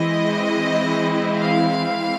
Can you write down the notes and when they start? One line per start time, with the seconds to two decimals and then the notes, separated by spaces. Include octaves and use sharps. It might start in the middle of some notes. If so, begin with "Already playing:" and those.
Already playing: E3 G#3 C4 E4 D#5
1.39 F5